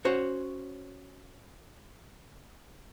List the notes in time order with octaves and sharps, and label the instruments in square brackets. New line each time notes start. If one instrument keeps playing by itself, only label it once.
[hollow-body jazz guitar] C#4 F#4 C5 C#5